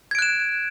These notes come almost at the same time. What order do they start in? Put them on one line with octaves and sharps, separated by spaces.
G#6 D7 F#6 E7